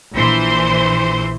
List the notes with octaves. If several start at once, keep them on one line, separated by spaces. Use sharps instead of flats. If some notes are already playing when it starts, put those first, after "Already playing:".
A#1 E3 C5 C6